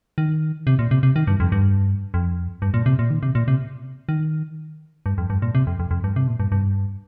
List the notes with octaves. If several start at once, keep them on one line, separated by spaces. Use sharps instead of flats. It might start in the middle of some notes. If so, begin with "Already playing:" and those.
D#3
C3
A#2
C3
C3
D#3
G2
F2
G2
F2
G2
A#2
C3
A#2
D#3
C3
A#2
C3
D#3
G2
F2
G2
A#2
C3
F2
F2
F2
G2
C3
A#2
G2
G2